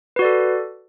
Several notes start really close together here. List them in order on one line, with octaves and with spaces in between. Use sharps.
B4 F#4 D5 A4